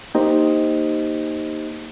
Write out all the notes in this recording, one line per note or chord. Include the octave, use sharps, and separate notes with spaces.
A#3 D#4 G4 C5 D#5